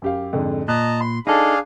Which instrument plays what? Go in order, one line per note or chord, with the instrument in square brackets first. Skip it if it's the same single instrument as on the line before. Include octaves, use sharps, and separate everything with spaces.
[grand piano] F#2 G4 F5
F2 G#2 D3
[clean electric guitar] A#2 [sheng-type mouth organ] D#5 A5 A#5 [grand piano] F#6
[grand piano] B5 [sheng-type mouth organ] C6
[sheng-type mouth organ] D4 G#4 F5 [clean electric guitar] D#4 A4